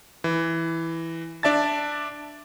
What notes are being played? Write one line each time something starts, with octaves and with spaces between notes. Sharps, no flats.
E3
D4 D5 E5 A5 A6